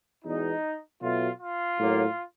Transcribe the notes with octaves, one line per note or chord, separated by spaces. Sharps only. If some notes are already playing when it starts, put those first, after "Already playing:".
E2 B2 G#3 D#4
B2 F#3 A3 F4
F4
A2 F#3 A#3